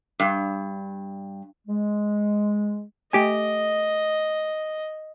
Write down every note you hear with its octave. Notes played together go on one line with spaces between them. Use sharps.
G2
G#3
A3 G4 D#5 G#5